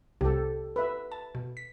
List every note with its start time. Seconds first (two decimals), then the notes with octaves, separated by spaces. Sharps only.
0.21 C2 C3 G4 A4
0.76 B4 E5
1.12 A5
1.35 B2
1.57 B6